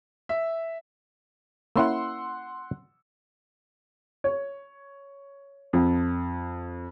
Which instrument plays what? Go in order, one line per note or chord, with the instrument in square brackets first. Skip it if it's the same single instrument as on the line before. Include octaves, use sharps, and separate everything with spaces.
[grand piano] E5
[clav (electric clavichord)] A#3 C#4 E4 [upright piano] F#5 C6 E6
[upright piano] C#5
F2